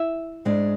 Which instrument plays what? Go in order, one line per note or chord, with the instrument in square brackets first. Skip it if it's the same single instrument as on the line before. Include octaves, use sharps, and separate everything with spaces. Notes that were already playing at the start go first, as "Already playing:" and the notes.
Already playing: [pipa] E4 E5
[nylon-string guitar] G#2 G#3 D4